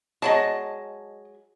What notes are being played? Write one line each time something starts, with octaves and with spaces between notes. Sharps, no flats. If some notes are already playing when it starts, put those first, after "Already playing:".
F#3 G#3 D#5 A5